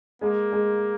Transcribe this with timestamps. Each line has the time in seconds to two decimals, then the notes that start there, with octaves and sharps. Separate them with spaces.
0.21 G#3 A#3
0.52 G#3